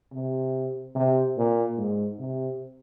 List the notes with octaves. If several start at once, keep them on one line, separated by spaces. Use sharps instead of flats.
C3
C3
A#2
G#2
C3